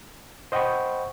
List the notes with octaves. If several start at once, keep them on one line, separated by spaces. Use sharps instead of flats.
C5 D#5 F#5 G5 B5 C#6